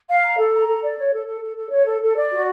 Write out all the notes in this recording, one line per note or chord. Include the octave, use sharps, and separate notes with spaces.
F5
A#5
A4
A#5
A4
D5
C#5
A4
A4
A4
A4
C#5
A4
A4
D5
F#4